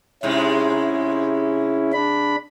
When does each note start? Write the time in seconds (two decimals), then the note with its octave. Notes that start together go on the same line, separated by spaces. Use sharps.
0.23 G#2 C3 G#3 C#4 E4
1.93 D4 B5